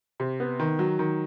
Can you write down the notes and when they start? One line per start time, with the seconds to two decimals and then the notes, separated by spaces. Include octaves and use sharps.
0.20 C3
0.40 B3
0.60 D#3
0.79 F#3
0.99 D#3